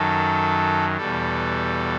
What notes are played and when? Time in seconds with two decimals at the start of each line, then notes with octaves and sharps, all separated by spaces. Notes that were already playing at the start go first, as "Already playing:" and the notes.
Already playing: F#2 D#3 F#3 A4
0.96 E2 B2 G3 A4